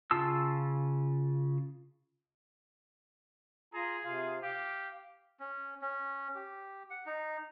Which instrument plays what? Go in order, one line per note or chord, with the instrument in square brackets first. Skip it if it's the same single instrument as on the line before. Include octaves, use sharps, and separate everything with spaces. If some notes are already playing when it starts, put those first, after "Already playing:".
[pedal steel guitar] C#3 F4 A5 E6
[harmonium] F4 A#5 [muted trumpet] G#4
[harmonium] C3 F4 F5
[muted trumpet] G4 [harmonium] F5
[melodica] C#4
C#4
G4
F#5
D#4